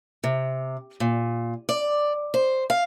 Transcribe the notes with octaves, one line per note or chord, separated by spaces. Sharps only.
C3
A#2
D5
C5
F5